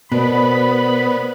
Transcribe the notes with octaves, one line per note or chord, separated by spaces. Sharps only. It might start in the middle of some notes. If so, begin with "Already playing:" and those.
B2 B3 A#4 C5 D5 B5